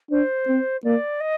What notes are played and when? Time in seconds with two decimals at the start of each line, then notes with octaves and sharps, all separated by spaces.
0.11 D4 C5
0.48 C4
0.84 A#3 D5
1.20 D#5